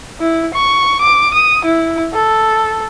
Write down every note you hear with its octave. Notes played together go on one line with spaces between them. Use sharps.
E4
C#6
D6
D#6
E4
A4